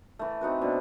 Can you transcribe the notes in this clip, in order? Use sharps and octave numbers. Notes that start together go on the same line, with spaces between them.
E3 A3
C4 D#4 F#4 B4
B2 D4